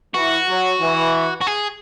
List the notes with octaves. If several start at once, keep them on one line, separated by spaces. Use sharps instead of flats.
E3 F#4
F#3
E3
F#4
G#4